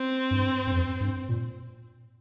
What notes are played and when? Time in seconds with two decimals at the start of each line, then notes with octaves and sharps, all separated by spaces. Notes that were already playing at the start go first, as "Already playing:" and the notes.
Already playing: C4
0.31 G2
0.67 G2
0.72 F2
1.00 G2
1.29 A#2